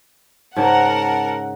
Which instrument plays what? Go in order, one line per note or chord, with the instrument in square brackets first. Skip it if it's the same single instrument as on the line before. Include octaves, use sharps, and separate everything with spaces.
[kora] G#2 C#3 [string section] A#4 F#5 [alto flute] A5